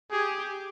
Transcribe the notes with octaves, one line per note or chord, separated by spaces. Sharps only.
G4 G#4